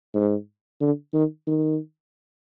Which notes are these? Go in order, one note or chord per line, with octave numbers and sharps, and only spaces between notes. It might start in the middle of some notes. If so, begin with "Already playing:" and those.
G#2
D3
D#3
D#3